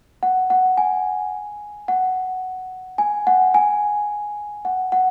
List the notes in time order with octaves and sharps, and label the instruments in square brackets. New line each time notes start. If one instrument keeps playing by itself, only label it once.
[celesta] F#5
F#5
G#5
F#5
G#5
F#5
G#5
F#5
F#5